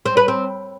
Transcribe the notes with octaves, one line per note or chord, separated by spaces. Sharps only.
C4
B4
C4